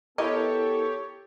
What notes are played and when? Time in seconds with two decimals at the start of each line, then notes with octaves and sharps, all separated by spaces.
0.18 B3 E4 G4 A4 A#4 C#5 D#5